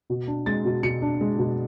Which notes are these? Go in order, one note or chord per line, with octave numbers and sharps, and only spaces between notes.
B2
D4
G#3 A6
B2
B2 C#7
D4
G#3
B2